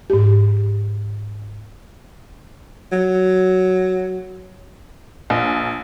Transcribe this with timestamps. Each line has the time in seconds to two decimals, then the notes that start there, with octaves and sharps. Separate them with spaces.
0.10 G#2 G4
2.92 F#3
5.30 A#1